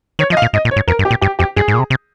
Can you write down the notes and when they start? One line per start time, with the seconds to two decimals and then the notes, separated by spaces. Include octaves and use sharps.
0.19 D#3 C#5
0.30 F3 D#5
0.37 F5
0.42 A#2
0.53 G#2 D#5
0.65 A#2
0.71 C#5
0.76 G#2
0.88 F2 A#4
0.99 G2
1.05 G4
1.11 A#2
1.22 G2 G4
1.39 F2 G4
1.56 G2 G#4
1.68 G#2
1.74 A#2
1.79 C3
1.90 C3